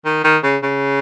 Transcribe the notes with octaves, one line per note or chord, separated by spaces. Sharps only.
D#3
D#3
C#3
C#3